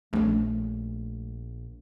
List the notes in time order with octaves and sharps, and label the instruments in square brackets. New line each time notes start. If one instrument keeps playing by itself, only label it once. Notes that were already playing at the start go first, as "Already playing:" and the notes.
[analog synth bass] A#1 [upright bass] A3 C#4